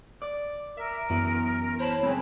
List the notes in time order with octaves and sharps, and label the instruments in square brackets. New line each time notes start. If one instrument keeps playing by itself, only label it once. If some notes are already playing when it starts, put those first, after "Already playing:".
[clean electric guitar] D5
[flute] A#4 [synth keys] E5
[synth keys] F#2 [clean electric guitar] E3 B3
[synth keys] C5 B5 [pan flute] C#5 [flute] A5
[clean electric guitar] C#2 F#2 G#4 [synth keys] C4 [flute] B5